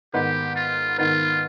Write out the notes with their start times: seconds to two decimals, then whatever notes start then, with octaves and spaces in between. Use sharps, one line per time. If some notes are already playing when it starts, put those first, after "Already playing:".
0.14 G#2 D#3 B3 D#4 G4 B4
0.56 F4
0.98 G#2 D#3 B3 D#4 F4 B4